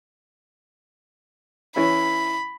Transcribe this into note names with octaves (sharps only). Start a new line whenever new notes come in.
E3 C#4 E4 B5